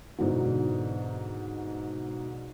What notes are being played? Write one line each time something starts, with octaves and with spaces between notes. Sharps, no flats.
G#2 B2 D3 E3 F#3